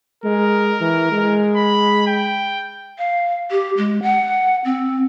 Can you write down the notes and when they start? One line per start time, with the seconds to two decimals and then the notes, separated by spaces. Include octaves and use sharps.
0.24 G#3 A#4
0.81 E3
1.11 G#3
1.56 B5
2.07 G5
2.99 F5
3.51 G4
3.77 G#3
4.02 F#5
4.65 C4